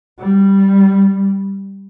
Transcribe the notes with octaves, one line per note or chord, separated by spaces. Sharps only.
G3